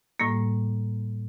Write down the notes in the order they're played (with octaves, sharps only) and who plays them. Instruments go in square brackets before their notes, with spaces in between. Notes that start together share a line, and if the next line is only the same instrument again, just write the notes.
[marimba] A2 G3 A#3